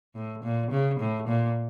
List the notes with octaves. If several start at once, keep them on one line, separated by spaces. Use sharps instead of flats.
A2
A#2
C#3
A2
A#2